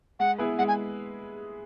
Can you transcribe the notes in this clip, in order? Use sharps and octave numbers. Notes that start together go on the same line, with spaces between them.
G#3 F#5
B3 E4 G#4 B4
G#3 F#5
G#5